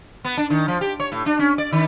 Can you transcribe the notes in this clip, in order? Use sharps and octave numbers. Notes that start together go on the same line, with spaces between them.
B3
D4
D#3
F3
G4
C#5
A2
D4
C#4
D5
D#3